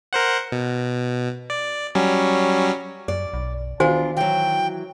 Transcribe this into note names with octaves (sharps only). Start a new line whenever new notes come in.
A#4 C5 F#5
B2
D5
F#3 G3 C#4
F#2 D5
B1
E2 D#3 D4 F4 F#4 C5 G#5
E3 F#3 G5